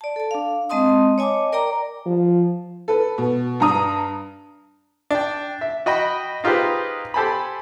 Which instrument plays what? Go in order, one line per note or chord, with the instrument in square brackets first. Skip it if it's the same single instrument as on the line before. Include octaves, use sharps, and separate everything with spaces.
[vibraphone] D5 A5
A4 A5
D4 F5
G#3 C4 D#5 A5 C6 D#6
C#5 D#5 G#5 A5 D6
A#4 D5 G5 A#5 D6
[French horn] F3
[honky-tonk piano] A4 B4
B2
G2 D4 A#5 D#6
[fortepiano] D4 G5
E5
F#4 D#5 G5 B5
D#4 F4 G4 G#4 B4 C5
G4 A4 C5 G#5 A5 B5